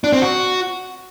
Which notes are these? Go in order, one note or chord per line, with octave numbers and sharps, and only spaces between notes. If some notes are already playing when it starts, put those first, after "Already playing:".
D4
C4
F#4